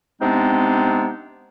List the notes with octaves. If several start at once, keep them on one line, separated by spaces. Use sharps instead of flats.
C3 G#3 B3 C4 D4 D#4